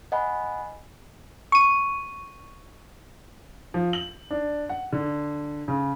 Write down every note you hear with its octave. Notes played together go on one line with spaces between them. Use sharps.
D#5 F#5 G#5 B5
C#6 D#7
F3
F#7
D4
F#5
D3
C#3